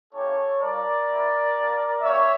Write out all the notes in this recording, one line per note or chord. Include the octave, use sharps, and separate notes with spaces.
A#3 C#4 E4 G4 A4 C#5
G3 D4 F4 A#4 D5
A3 E4 G4
A#3 D4 G4
A#3 C#4 G4 C#5 E5